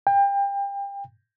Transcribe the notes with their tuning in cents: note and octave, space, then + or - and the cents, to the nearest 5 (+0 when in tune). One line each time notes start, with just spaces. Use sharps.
G5 +30